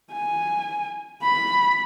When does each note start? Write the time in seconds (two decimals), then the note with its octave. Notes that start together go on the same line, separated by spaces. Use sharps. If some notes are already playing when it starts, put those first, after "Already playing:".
0.13 G#5
1.23 B5